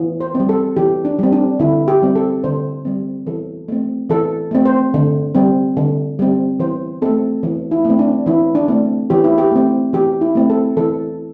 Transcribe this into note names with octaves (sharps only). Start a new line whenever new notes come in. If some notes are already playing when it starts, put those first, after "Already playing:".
Already playing: E3
C5
C4
G3
A4
E3 G4
D4
G3 C4
D4
D3 E4
G4
G3 C4
A4
D3 C5
G3 C4
E3 A4
A3 C4
E3 A4
A3 C4
C5
D3
G3 C4
D3
G3 C4
E3 C5
A3 C4 A4
E3
E4
A3 C4
D4
E3 E4
D4
A3 C4
E3 G4
E4
G4
A3 C4
E3 G4
E4
A3 C4
A4
E3 A4